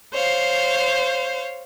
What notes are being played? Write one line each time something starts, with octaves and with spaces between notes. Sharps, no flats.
C5 C#5 F5